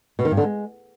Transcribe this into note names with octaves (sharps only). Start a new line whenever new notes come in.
B2
D#3
G2
D3
G#3